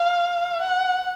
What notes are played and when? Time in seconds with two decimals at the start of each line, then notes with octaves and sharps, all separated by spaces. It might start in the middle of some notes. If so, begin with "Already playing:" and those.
Already playing: F5
0.62 F#5